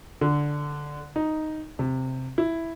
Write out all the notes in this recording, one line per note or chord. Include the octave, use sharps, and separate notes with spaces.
D3
D#4
C3
E4